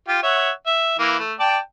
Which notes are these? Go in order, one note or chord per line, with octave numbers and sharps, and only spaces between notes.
F4 G4
C#5 E5 F#5
E5
E3 A#3
A3
D5 G5 A5